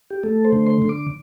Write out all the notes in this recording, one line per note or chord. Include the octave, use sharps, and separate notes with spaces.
G4
A3 A4
C5
D3
C6
D3
D6